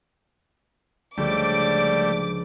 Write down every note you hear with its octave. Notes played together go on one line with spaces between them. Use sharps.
C#2 D3 F3 G3 A3 D5 D6